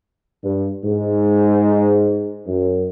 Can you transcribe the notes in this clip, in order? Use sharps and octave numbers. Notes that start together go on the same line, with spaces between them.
G2
G#2
F#2